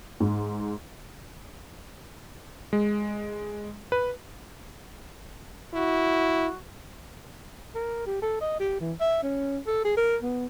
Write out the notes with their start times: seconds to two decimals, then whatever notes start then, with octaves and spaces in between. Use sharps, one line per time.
0.20 G#2
2.73 G#3
3.92 B4
5.73 E4 F#4
7.75 A#4
8.06 G4
8.22 A4
8.41 D#5
8.59 G4
8.80 E3
9.00 E5
9.23 C#4
9.67 A4
9.85 G#4
9.97 A#4
10.22 B3